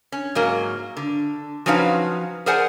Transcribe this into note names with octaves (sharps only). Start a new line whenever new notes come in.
C#4
G#2 F#3 A#3
D3
F3 F#3 C#4 D#4 B4 F5
G#4 A#4 C5 D5 F#5 G#5